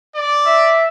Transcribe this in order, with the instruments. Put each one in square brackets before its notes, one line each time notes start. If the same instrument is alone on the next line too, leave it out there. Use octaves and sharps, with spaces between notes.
[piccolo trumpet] D5
[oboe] E5